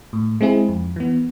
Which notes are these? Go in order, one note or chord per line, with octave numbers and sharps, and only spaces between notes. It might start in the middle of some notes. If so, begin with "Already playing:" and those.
A2
G#3 C4 E4 G#4
F2
E3 B3